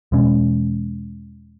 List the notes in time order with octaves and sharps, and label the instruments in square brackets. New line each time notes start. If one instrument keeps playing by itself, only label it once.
[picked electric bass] E2 B2 G#3 C#4